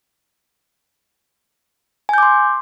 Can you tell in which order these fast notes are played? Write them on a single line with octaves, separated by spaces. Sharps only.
G#5 G6 D6 C6